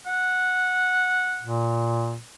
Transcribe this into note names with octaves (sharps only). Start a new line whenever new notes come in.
F#5
A#2